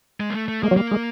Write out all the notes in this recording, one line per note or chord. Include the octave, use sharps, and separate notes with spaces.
G#3
A#3
A3
A3
G#3 A#3
F#3
G3 A#3
G#3